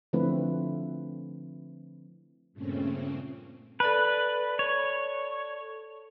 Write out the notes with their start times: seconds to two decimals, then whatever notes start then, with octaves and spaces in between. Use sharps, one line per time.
0.13 D3 F3 A3 C4 E4 B4
2.53 G2 A#2 C#3 A3 C4 C#4
3.80 A4 B4 D5 A5
4.59 C#5